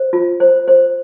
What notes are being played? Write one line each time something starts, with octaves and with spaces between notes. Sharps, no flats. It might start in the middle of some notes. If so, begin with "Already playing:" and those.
Already playing: C5
F4
C5
C5